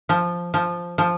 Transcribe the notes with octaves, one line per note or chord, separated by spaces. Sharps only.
F3
F3
F3